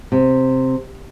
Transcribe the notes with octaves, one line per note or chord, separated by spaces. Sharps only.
C3